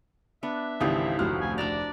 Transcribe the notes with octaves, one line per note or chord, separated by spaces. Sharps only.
B3 D4 E5
G#1 C#2 E3 G4 A4 C5 D#6
F1 D2 F#4 C5 F6
G#5
D4 D5 E5 A#5